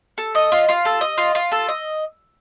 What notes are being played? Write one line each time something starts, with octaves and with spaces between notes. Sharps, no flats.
A4
D#5
F4
F4
A4
D#5
F4
F4
A4
D#5